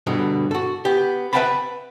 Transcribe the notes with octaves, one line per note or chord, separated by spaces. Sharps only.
G2 B2 D3
F#4 A4
B3 G4
B4 E5 F#5 G5 A5 B5